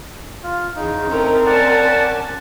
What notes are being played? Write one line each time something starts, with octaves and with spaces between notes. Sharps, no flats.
F4
E2 C#3 D#4
A3 C4 C#4 A#4
C#4 D5 F#5 G#5 A5